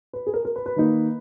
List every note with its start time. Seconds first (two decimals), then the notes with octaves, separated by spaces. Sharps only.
0.13 B4
0.27 G#4
0.34 A#4
0.45 A#4
0.56 B4
0.66 B4
0.76 D#3 A#3 D#4